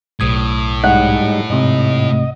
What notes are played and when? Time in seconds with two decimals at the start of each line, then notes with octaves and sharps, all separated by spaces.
0.20 B1 A2 D#6 G#6
0.84 G#2 G3 D#4 F#5
1.50 G#2 C3 D#5